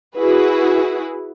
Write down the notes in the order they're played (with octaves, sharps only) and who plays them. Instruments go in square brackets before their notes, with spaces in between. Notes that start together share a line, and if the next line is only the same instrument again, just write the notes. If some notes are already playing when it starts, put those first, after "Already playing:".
[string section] E4 F#4 G#4 B4